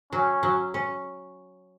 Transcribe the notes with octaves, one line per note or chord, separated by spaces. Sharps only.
F#3 C#4
F#3
C#4